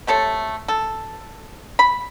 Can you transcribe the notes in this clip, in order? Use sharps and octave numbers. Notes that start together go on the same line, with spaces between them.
C3 A3 A4 C#5
A4
B5